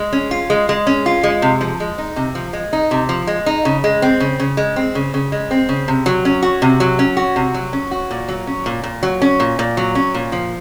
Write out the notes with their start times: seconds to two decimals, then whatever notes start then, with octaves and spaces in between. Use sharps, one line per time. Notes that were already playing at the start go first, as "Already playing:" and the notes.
Already playing: G#3
0.13 C#4
0.31 F4
0.50 G#3
0.69 G#3
0.87 C#4
1.06 F4
1.23 G#3
1.42 C3
1.61 F3
1.80 G#3
1.98 D#4
2.16 C3
2.35 F3
2.53 G#3
2.73 D#4
2.91 C3
3.09 F3
3.27 G#3
3.46 D#4
3.65 C#3
3.84 G#3
4.02 C4
4.20 C#3
4.40 C#3
4.57 G#3
4.76 C4
4.95 C#3
5.14 C#3
5.32 G#3
5.51 C4
5.69 C#3
5.88 C3
6.06 F#3
6.25 C#4
6.43 F#4
6.62 C3
6.80 F#3
6.99 C#4
7.17 F#4
7.36 C3
7.54 F#3
7.73 C#4
7.91 F#4
8.11 A#2
8.28 F#3
8.47 C#4
8.66 A#2
8.84 A#2
9.03 F#3
9.22 C#4
9.40 A#2
9.59 A#2
9.77 F#3
9.95 C#4
10.15 A#2
10.32 F3